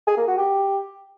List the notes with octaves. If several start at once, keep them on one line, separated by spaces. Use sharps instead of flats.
G#4
A#3
F#4
G4